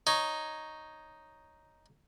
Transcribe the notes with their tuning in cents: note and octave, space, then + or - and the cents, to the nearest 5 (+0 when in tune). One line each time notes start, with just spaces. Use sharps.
D#4 +0 C#5 +0